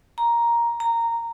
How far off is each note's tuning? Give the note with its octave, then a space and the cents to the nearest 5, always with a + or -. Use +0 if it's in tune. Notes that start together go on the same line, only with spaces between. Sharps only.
A#5 +5
A#5 -15